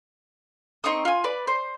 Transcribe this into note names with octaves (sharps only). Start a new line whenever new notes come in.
C4 D#4 C#6 D#6
F4 G#5
B4 D5
C5